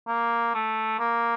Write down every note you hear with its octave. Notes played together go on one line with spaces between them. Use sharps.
A#3
A3
A#3